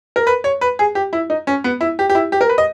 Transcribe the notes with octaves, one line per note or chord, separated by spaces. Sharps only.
A#4
B4
C#5
B4
G#4
G4
E4
D#4
C#4
B3
E4
G4
G4
E4
G4
A#4
B4
D#5